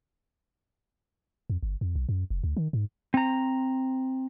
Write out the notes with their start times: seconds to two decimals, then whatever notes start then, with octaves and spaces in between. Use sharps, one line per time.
1.50 F2
1.63 G1
1.81 F2
1.95 B1
2.09 F#2
2.30 F1
2.44 D2
2.57 D#3
2.73 G#2
3.14 C4 A#5